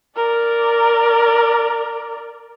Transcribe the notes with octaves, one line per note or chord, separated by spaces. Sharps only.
A#4 D5